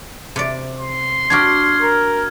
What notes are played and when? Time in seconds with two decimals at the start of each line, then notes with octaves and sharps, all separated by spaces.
0.36 C3 D5
0.79 C6
1.30 D4 F#4 G4 F6 G#6
1.82 A#4